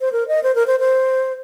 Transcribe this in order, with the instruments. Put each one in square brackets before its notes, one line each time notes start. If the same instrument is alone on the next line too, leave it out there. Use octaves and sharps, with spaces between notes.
[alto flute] C5
A#4
D#5
C5
A#4
C5
C5